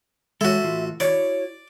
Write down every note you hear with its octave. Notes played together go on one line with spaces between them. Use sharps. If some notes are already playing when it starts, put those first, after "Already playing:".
G#3 F#4 A4 C#5 E5
A2 E3 F4
E4 F#4 C#5 D5